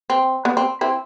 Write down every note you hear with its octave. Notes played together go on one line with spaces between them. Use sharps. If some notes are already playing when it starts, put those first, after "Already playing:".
C4
B3
C4
C4 E4